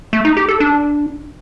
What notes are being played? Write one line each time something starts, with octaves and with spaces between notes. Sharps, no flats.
A3
D#4
G4
A4
D4